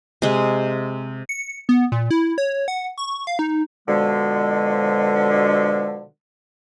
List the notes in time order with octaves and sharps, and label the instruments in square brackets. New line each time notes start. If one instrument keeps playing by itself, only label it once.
[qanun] C3 G#3
[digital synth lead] C#7
B3
A#2
E4
C#5
F#5
C#6
F5
D#4
[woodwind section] B2 D3 F3 G#3